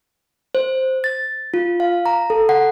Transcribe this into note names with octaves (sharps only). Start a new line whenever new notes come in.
C5
A6
F4
F5
A#5
A4
F#5